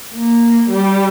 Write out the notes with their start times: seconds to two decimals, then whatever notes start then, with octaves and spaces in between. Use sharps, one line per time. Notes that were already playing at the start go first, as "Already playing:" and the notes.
0.14 A#3
0.70 G3